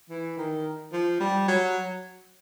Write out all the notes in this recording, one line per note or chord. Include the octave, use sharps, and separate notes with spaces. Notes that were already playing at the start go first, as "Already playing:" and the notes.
E3
D#3
F3
G3
F#3